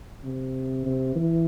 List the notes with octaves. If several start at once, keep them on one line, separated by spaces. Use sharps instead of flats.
C3
C3
E3